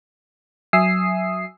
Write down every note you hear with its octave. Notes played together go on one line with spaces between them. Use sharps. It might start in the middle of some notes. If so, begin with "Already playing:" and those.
F#3 E5 G#5 D#6 E6 C7